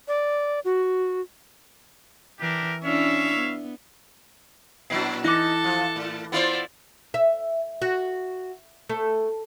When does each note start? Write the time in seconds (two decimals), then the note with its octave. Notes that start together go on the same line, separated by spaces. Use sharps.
0.08 D5
0.65 F#4
2.40 E3 D4 G4 A#4
2.83 C#4 D4 E4 C#5 E5 F5
3.36 B3
4.90 A#2 F#3 D4 E4 C7
5.24 E3 D#4 A4 A5 D6 F#6 A#6
5.64 F3
5.96 A2
6.32 B3 E4 F4 C5 D5
7.14 E5
7.82 F#4
8.89 A3